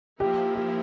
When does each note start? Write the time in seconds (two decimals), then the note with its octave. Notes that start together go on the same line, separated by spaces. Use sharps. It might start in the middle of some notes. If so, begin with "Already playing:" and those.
0.20 F3 A#3 E4 G4
0.55 G4